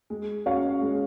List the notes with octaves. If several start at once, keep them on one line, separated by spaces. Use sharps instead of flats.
G#3
C#4 F#4 C#5 F5
G#3